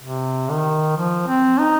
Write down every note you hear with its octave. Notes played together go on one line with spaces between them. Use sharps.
C3
D#3
F3
C4
D#4